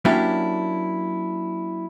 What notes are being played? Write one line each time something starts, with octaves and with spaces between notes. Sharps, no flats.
F#3 A#3 C#4 D4 E4 G4